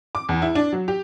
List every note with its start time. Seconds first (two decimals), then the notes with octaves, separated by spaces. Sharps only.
0.15 D6
0.29 E2
0.42 E4
0.55 D4
0.73 F#3
0.88 G4